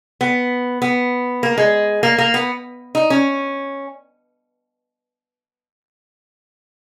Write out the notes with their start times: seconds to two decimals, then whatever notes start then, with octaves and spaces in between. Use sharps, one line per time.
0.21 B3
0.82 B3
1.43 A#3
1.58 G#3
2.03 A#3
2.18 A#3
2.34 B3
2.95 D#4
3.10 C#4